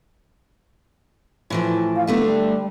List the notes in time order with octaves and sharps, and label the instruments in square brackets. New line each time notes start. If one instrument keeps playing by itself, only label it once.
[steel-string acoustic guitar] A2 E3 F3
[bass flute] F5
[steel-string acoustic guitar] D3 A3 D4 [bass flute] B3
[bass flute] G3